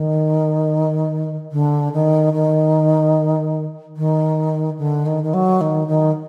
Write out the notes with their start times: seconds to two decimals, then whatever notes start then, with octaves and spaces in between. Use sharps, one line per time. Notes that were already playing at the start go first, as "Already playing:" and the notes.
Already playing: D#3
1.52 D3
1.93 D#3
2.33 D#3
3.97 D#3
4.78 D3
5.06 D#3
5.23 D#3
5.34 F#3
5.61 D#3
5.88 D#3